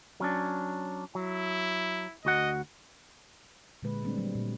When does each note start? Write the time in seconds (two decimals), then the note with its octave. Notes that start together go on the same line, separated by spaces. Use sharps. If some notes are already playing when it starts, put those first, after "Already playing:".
0.20 F#3 C#4 D4
1.15 F#3 E4
2.25 D2 F#4 D#5 F#5
3.83 A#2 D3 G#3 B4
4.04 G3 A3 C4 D4
4.18 F#3 G3
4.35 A#2